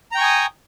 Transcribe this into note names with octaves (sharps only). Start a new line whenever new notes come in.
G5 G#5 A#5 C#6 D#6